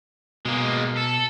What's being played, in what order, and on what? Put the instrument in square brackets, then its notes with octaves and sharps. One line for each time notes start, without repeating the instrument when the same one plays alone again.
[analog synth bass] B2 [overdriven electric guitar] G#3 A#3
[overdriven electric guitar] A4